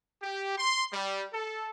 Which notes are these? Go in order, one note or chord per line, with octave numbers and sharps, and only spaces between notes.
G4
C6
G3
A4